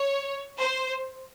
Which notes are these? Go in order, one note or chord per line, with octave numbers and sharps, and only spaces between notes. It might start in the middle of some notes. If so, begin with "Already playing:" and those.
Already playing: C#5
C5